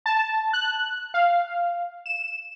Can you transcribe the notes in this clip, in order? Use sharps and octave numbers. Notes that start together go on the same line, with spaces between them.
A5
F#6
F5
E7